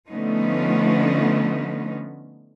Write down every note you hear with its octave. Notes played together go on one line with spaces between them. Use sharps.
D3 F3 A3 B3 C#4 D#4